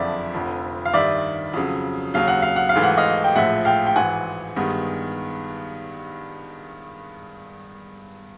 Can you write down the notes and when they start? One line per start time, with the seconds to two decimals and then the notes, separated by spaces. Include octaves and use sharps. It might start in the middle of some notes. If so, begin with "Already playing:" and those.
Already playing: F#1 F2 D3 F3 D5 E5
0.34 F1 F2 D3
0.85 F5
0.93 G2 D#3 G3 D5 E5
1.54 F2 C#3 F#3
2.14 D#2 C#3 F#3 F5
2.28 F#5
2.42 F5
2.56 F#5
2.69 F5
2.75 G#1 G#2 E3 A3
2.83 F#5
2.97 D#5 F5
3.24 G5
3.36 A#1 A2 F3 G#3 E5 F#5
3.65 F5 G5
3.87 G5
3.95 G#1 G#2 E3 F#5 G#5
4.56 G2 D#3 G#3 B3